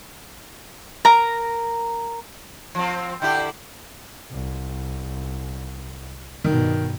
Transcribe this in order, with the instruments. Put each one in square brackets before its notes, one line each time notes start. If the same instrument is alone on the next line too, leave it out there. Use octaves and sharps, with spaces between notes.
[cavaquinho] A#4 A#5
[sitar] F3 C4
[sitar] D3 E4 G4 [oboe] G5
[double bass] C2
[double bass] G2 B2 [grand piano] D#3